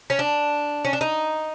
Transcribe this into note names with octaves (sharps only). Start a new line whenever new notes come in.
C#4
D4
C#4
D4
D#4